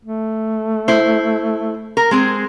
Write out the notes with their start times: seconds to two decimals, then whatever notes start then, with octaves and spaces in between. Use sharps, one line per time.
0.05 A3
0.88 E4 C5
1.97 A#4
2.11 G#3 C4 G#4